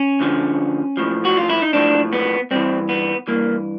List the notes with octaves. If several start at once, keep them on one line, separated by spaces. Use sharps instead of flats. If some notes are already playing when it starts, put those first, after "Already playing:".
Already playing: C#4
D2 D3 F3
B1 A2 F3
F#4
F4
E4
D#4
B1 A2 F3 D4
B3
G2 E3 C4
B3
G2 E3 A#3